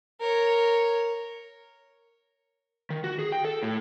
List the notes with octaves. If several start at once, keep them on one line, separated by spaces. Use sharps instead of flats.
A#4 C#5
D#3
F#4
G#4
G5
A4
A2